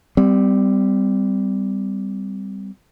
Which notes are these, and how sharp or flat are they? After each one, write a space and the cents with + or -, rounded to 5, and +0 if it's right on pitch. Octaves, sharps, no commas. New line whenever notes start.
G3 +0 C4 -30